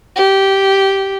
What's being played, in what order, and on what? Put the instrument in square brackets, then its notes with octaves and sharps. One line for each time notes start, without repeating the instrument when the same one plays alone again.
[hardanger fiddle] G4